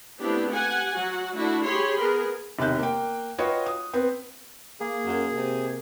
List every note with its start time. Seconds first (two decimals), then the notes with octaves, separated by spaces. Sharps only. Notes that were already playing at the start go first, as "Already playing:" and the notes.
0.21 A3 B3 C4 D4 E4 G4
0.50 G4 F#5 G#5
0.95 F#3 F#4 F#5
1.35 A3 D4 E4 F#4
1.66 G4 G#4 C#5 B5 C6
1.99 B3 G#4 A#4
2.59 E1 C3 D#3 F#6 G6
2.79 A#3 G5
3.38 F4 F#4 B4 C#5 D#5 G5
3.66 D#6
3.94 B3 C4
4.80 A#3 G#4
5.06 F#2
5.33 C3